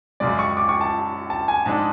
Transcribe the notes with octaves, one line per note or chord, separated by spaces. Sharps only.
F#2 C#3 G#3 D5
C#6
D6
C#6
A5
A5
G#5
G#2 G#3 D4 A5